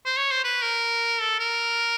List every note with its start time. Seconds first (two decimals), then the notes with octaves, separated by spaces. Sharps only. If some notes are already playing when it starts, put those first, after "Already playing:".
0.06 C5
0.18 C#5
0.31 C5
0.44 B4
0.62 A#4
1.21 A4
1.39 A#4